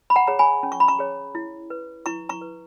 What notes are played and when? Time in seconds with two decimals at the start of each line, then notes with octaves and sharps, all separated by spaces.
0.10 B5
0.16 F#5 A#5
0.27 G#4 C#5 A#5
0.39 G#5 B5
0.63 C#4
0.72 C#6
0.80 B5
0.88 A#5 C#6
0.99 G#4 C#5
1.35 E4
1.70 B4
2.06 E4 A#5 C#6
2.29 A#5 C#6
2.41 B4